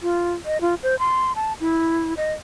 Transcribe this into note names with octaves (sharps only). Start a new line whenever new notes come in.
F4
D#5
F4
C5
C6
A5
E4
D#5